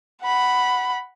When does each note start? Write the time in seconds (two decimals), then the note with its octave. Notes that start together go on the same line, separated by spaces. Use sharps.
0.23 F#5 B5